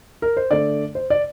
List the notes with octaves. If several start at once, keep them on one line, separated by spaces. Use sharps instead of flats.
A#4
C5
D3 A3 D5
C5
D5